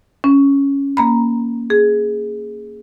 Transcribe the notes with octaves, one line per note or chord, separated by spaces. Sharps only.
C#4
A#3 A#5 B5
G#4